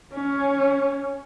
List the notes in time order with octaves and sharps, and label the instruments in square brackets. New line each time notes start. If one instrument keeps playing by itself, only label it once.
[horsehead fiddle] C#4